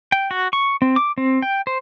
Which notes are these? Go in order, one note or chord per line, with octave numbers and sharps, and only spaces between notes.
G5
F#4
C#6
C4
D6
C4
G5
C5